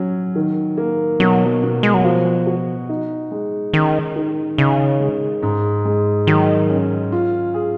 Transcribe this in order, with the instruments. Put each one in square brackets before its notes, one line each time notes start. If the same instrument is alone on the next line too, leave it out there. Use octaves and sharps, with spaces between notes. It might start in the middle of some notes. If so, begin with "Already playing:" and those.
Already playing: [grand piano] F#3 C#4
D#3
A#3
[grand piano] B2 [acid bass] F#3
[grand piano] B2
[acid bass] G#3
F#3
[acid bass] F3 [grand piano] F#4
[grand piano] F#4
D#4
G#3
[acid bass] D#3 [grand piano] C#4
[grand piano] D#3
[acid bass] C#3 [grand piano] D#4
[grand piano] G#3
G#2
G#3
[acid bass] D#3 [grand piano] F#3
[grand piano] C#4
F4
G#4